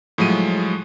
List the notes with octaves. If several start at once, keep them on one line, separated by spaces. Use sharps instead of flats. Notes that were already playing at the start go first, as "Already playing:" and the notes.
A2 F3 F#3 G#3 D#7